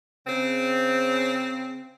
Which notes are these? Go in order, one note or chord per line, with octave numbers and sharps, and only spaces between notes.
C#3 C4